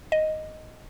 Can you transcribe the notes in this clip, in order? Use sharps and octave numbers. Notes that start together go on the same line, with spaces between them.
D#5